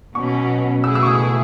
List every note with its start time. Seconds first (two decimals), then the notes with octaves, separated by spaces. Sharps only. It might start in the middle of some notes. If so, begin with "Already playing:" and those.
0.15 B2 F#3 C#4 C#6
0.83 B2 A3 E4 G#4 E6
0.95 E6
1.03 C#6
1.07 D#6